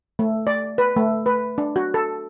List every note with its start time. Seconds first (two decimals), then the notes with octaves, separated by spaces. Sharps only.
0.19 A3
0.47 D5
0.78 B4
0.96 A3
1.26 B4
1.58 D4
1.76 F#4
1.94 A4